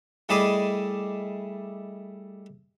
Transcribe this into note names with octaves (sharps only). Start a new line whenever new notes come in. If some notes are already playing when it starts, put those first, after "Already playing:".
G3 A3 E4 G#4 D5 D#5